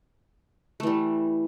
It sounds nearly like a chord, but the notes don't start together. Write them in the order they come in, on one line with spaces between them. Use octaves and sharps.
A3 E3 G3